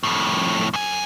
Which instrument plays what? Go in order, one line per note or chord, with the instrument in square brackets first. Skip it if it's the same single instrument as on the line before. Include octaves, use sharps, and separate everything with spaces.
[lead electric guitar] F2 A2
F#2 G#5